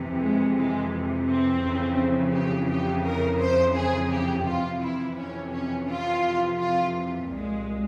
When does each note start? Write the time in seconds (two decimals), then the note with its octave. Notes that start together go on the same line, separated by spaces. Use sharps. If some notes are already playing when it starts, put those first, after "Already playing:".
Already playing: F2 C3 E3
0.20 G#3
0.56 G#3
1.27 C4
1.62 F2 C#3 E3
2.33 G4
2.68 G4
3.04 A#4
3.39 C5
3.75 G#4
4.10 G4
4.46 F2 C3 E3 F4
4.81 E4
5.17 C#4
5.52 C#4
5.88 F4
6.58 F4
7.29 C2 A#2 G#3